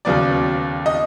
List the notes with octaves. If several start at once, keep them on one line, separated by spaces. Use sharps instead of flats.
D#2 C#3 F#3 B3 D5
D#5